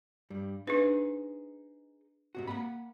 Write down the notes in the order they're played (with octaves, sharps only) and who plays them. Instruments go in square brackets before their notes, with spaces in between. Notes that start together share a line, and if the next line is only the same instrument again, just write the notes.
[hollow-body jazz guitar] G2 G3
[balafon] D4 B4 [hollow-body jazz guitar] D#4 G#4 C5
[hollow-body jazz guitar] G#2 C3 F#4
A#3 F#5 B5